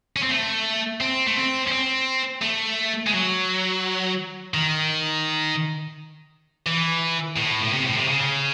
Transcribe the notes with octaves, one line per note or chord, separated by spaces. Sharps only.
C#4
C4
A3
C4
A3
C4
C#4
C4
A3
G#3
F#3
D#3
E3
A2
A2
C3
A2
C3
C#3